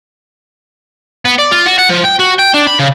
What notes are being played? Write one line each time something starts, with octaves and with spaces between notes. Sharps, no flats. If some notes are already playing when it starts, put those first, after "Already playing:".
B3
D5
F4
F#4
F#5
F3
G5
F#4
G5
D4
B5
C#3